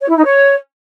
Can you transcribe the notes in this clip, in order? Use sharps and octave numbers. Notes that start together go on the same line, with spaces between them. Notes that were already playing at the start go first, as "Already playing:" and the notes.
C#5
E4
D#4
C#5